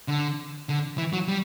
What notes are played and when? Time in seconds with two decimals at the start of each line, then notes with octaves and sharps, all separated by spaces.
0.08 D3
0.69 D3
0.98 E3
1.13 F#3
1.28 G3